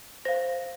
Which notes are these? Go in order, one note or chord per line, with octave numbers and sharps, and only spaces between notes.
C5 F5 A#6